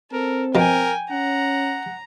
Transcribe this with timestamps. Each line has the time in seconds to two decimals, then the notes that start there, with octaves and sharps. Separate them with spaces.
0.13 C4 A4 A#4
0.55 B2 F3 A#4 G5 G#5
1.11 C#4 F#5 A#5